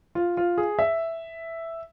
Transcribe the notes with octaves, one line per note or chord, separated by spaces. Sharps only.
F4
F4
G#4
E5